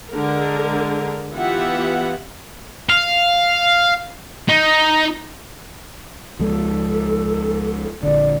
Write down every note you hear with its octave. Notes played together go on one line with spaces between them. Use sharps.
D3 G#3 A#4
E3 B3 F4 G4 E5 F#5
F5
D#4
C#2 F3 G#3 A4
A#1 D3 D5